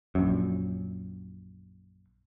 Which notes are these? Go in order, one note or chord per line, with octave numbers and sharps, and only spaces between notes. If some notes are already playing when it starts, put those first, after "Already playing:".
A#1 F#2